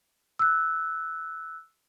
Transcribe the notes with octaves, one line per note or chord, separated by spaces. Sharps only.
E6 F#6